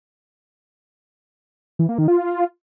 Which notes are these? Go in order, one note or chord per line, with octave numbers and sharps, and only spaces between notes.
E3
A#3
D#3
F4